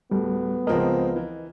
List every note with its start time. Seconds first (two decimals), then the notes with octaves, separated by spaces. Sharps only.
0.11 D1 G3 A3 B3
0.67 C#2 F3 G#3 C4 A#4 D#5
1.16 E3